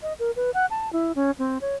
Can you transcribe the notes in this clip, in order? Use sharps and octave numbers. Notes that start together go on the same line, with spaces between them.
D#5
A#4
B4
F#5
A5
E4
C#4
C4
C#5